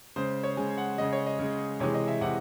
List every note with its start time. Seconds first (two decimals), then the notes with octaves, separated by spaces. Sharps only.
0.16 C#3 G#3 C5
0.43 C#5
0.57 C#3 G#3 G#5
0.78 F#5
0.98 C#3 G#3 D#5
1.13 C#5
1.26 D#5
1.39 C#3 G#3
1.80 C3 E3 G#3 C#5
1.94 D#5
2.08 E5
2.21 C3 E3 F#5